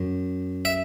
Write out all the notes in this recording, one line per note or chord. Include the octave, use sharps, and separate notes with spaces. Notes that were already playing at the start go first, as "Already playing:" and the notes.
Already playing: F#2
E5